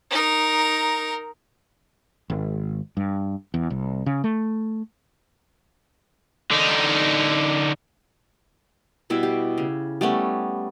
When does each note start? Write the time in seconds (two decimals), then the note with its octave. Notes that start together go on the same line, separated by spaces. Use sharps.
0.11 D#4 A#4
2.30 G#1
2.97 G2
3.54 E2
3.70 C2
4.06 C#3
4.24 A3
6.51 D3 D#4
9.10 B2 G3 E4 E5
9.23 G4
9.58 C#3
10.01 G3 A3 B3 C#4